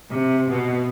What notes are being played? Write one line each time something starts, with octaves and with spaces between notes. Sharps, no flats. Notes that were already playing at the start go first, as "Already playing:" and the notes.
C3
B2